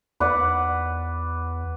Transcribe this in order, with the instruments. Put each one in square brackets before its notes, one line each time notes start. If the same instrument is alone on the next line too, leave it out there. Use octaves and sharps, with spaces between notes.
[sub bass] E2 [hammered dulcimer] B4 D5 F#5